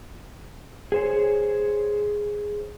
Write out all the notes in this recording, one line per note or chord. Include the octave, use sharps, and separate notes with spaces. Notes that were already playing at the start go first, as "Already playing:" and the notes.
G#4 C5 C#5